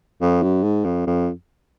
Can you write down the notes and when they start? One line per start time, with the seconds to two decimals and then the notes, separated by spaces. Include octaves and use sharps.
0.21 F2
0.43 F#2
0.63 G#2
0.85 F2
1.07 F2